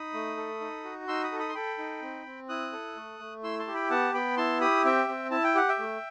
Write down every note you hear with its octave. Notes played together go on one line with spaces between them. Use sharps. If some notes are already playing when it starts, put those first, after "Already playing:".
Already playing: D#4 B5 D#6
A3
A4
D#4
F#4
D#4 C6 E6
B5 D#6
A4
B5 D#6
C6
A4 G5 B5
D#4
C4
C4
E4 D#6 F#6
A4
A3
A3
E4 C6 E6
A5 C6
G4
G5 B5
B3 F#5 A5
B3 G5 B5
E4 A5 C6
G4 B5 D#6
C4 E5 G5
C4
E4 A5
G5
G4 F#5
E5 G5
A3